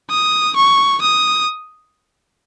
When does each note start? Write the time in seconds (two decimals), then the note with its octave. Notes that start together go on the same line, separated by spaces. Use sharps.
0.10 D#6
0.56 C#6
1.02 D#6